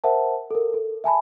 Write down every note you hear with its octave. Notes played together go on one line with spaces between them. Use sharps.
A#4 C5 E5 F#5 A5
A4 A#4
A4
E5 G#5 A5 B5